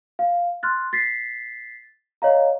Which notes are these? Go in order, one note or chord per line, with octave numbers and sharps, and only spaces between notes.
F5
C6 F6 F#6 A6
A6 B6 C7
C#5 D#5 F5 A#5